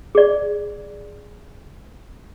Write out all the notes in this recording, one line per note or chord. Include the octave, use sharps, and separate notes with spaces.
G#4 D5